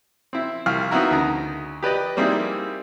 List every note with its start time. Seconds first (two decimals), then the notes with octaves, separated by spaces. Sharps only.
0.33 C4 E4
0.66 C2 F5 F6
0.91 B3 C4 D#4 E4 F#4 A#4
1.11 D2 C#3 D#4 A#5
1.83 G4 B4 D5 D#5
2.17 G3 A#3 C4 D#4 E4 G#4